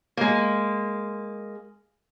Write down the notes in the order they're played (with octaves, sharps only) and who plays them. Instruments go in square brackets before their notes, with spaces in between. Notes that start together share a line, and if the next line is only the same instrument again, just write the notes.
[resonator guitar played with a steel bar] G#3 A#3